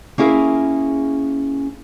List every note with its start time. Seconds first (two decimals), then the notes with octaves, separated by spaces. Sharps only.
0.18 A#3 C#4 E4 G#4 A#4